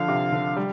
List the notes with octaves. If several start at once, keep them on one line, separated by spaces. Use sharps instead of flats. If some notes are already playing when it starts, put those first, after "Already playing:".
Already playing: D3 F3 F5
C3
D3
G3